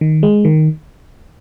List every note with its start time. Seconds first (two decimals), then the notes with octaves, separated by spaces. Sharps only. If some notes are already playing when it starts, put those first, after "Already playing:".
0.01 D#3
0.23 G#3
0.45 D#3